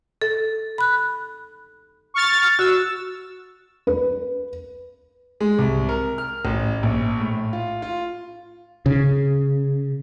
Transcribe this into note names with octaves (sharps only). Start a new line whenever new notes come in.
A4
B5 F#6
C#6 F6 A6
F#4 E6
B4
G#3
C2
A#4
F6
A1
A#1
A2
F4
F4
C#3